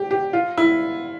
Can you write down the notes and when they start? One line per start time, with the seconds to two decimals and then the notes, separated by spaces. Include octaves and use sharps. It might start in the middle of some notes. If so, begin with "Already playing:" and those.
Already playing: G4
0.11 G4
0.33 F4
0.58 E4